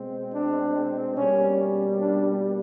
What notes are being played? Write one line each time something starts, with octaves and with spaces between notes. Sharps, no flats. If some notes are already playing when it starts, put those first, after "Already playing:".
Already playing: B2 G#3 C4
D4
B2 G3 A#3 C#4
C#4
D4